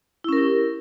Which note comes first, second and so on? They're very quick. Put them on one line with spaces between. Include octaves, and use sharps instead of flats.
E4 C#4 A#4 G4